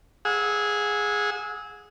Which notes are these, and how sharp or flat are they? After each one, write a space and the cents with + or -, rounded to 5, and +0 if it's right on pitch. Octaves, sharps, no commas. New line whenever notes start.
G#4 -5 F#5 -35 E6 -30